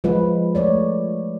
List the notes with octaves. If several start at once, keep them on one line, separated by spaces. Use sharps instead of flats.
F3 G#3 F4 B4
A3 C#5 D5